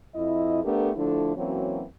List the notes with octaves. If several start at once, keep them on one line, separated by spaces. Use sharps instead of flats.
F2 E4 D#5
A3 B3 D4 G4 A4 A#4
D3 F3 A3 D4 E4 A4
E3 F#3 A#3 C4 C#4 F#4